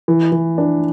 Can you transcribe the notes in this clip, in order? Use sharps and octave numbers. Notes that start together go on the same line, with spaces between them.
E3
E3
D4